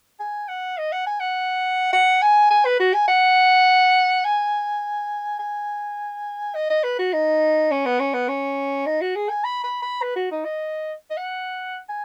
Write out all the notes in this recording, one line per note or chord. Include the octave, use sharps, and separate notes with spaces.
G#5
F#5
D#5
F#5
G#5
F#5
F#5
G#5
G#5
B4
F#4
G#5
F#5
G#5
G#5
D#5
D#5
B4
F#4
D#4
C#4
B3
C#4
B3
C#4
D#4
F#4
G#4
G#5
B5
B5
B5
B4
F#4
D#4
D#5
D#5
F#5
G#5